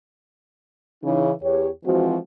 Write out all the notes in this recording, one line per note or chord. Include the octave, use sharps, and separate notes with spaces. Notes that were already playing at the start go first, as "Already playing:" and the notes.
C#3 E3 D#4
E2 G4 C#5
E3 F3 G#3 C4 F#4